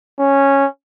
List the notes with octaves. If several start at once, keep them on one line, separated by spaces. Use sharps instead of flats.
C#4